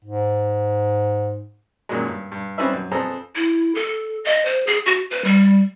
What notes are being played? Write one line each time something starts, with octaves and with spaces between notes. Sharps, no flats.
G#2
F#2 A#2 D#3 F#3 G#3
G2
G2
G3 C4 C#4 D#4 B4 E5
F#2
F2 B3 G#4 A4 C5 A#5
E4
A4
D#5
C5
G#4
F#4
B4
G3